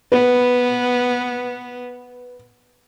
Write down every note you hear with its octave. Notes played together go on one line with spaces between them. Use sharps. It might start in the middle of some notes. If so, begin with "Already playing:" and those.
B3 B4